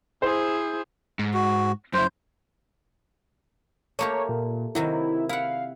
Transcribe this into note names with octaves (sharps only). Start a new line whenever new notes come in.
E4 G#4 C5
G#2
F#4
F#2 E4 C5
A3 A#3 G4 C#5
A#2
C3 D#3 F#3 E4
E4 F5 F#5